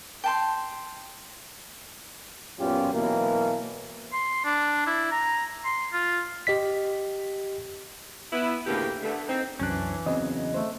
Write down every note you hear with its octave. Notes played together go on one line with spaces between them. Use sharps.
G5 A5 C6
F#2 A#2 B3 C#4 F4 G4
B2 E3 F#3 A#3
C6
D4
E4
A#5
C6
F4
G4 D#5 B6
B3 E4
D2 A2 C#3 E3 A#3 G4
D3 A3 B3
C4 D#4
C2 F#2 E3 C#4 D4 F#6
E2 C#3 F#3 C4 D#5
A3 C5